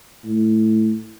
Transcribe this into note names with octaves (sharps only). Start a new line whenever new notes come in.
A2